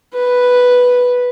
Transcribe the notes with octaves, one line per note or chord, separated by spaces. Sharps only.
B4